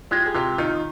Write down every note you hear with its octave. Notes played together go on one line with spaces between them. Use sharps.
G#3 F4 G4
G#4
C3 F4 G4
D#3 D#4 F4